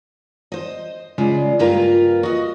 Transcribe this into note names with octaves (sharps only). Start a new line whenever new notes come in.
C5 D#5
C#3 G#3 F4 D5
G2 A#3 F4 A#4 B4 A#5
F#4 D#5